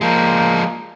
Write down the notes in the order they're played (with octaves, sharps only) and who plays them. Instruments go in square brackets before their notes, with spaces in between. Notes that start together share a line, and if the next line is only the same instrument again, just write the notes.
[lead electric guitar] F3 G#3 [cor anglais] A#3